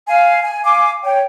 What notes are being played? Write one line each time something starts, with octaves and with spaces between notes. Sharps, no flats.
F5 G#5
G#5
F5 G#5 D6
C#5 G5